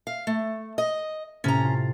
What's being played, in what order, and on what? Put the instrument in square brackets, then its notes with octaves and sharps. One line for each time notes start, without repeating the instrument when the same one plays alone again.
[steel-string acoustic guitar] F5
A3
D#5
[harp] A2 C3 A6 [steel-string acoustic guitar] C#4 A#5
[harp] F4